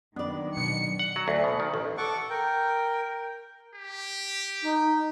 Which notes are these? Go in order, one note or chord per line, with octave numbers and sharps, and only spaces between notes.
D#3 F#3 B3 D4 D5
B2 C#7
F#5
F#3
D2
B2
D#3
A1
A4 F#5 C#6 D6
A#4 G5
G4
D#4